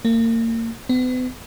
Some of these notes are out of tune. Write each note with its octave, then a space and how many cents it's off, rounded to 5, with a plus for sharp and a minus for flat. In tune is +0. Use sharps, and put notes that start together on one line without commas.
A#3 -35
B3 +40